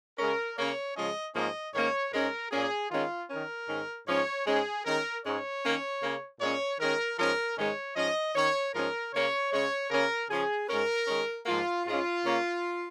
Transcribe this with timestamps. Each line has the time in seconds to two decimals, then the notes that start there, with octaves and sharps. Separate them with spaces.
0.18 C#3 G#3 C#4 A#4
0.57 C#3 A#3 C#4 C#5
0.96 C#3 F3 G#3 C#4 D#5
1.34 G#2 F3 A#3 C#4 D#5
1.74 G#2 D#3 A#3 C#4 C#5
2.13 G#2 G#3 C#4 A#4
2.51 A#2 A#3 C#4 G#4
2.90 D#3 G#3 C#4 F4
3.29 D#3 C#4 A#4
3.68 G#2 D#3 C#4
4.07 G#2 F3 C#4 C#5
4.46 G#2 G#3 C#4 G#4
4.85 D#3 G#3 C#4 A#4
5.24 G#2 G#3 C#4 C#5
5.63 D#3 A#3 C#4
6.01 C#3 A#3 C#4
6.40 A#2 G#3 C#4 C#5
6.80 D#3 G#3 C#4 A#4
7.19 G#2 F3 C#4 A#4
7.57 G#2 D#3 G#3 C#4 C#5
7.96 G#2 F3 C#4 D#5
8.35 D#3 C#4 C#5
8.74 G#2 F3 C#4 A#4
9.13 C#3 A#3 C#4 C#5
9.51 C#3 G#3 C#4 C#5
9.90 C#3 A#3 C#4 A#4
10.30 C#3 F3 C#4 G#4
10.68 G#2 G#3 C#4 A#4
11.07 D#3 G#3 C#4
11.46 G#2 F3 A#3 F4
11.85 G#2 G#3 C#4 F4
12.24 C#3 A#3 C#4